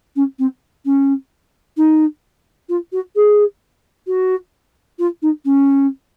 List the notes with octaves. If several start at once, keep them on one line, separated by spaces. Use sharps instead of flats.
C#4
C4
C#4
D#4
F4
F#4
G#4
F#4
F4
D#4
C#4